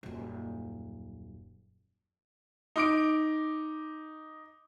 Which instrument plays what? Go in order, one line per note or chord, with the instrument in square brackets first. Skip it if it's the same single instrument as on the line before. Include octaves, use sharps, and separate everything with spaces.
[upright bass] D#1 F#2
[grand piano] D#4 D6 D7